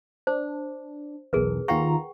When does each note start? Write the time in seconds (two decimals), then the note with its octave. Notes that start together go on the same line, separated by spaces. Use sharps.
0.27 D4 C5
1.33 B1 E2 G#4 A#4 B4
1.68 D#2 F4 F#5 G5 A#5 C#6